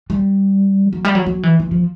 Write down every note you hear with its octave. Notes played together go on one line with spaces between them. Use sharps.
G3
F#3
G3
F#3
F#3
E3
E3
F3